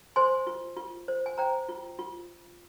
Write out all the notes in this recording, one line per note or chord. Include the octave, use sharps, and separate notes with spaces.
C5 G#5 C6
F4
F4
C5
G#5
C5 G5 A#5
F4
F4